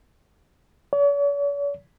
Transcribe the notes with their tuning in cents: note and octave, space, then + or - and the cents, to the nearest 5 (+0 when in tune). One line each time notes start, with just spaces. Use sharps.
C#5 +45